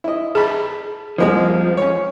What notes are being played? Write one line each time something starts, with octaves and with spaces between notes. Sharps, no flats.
E4 D#5
G#4 A5 B5
C2 F3 G#3 A#3
C#4 C#5